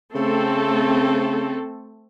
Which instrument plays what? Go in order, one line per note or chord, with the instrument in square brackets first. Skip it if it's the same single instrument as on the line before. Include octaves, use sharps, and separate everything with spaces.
[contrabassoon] C#3 [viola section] A3 C4 A4